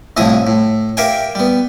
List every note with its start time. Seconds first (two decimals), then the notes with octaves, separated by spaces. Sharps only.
0.17 C2 F2 A2 E4 G#5 D#6
0.47 A2
0.97 G4 A#4 E5 F5 G5 G#5
1.35 G3 B3